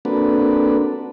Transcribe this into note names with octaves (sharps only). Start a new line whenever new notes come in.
A#3 C4 D4 F#4 A4 B4